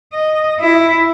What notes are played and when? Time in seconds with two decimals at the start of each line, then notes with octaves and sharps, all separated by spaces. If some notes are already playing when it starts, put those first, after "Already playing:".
0.13 D#5
0.60 E4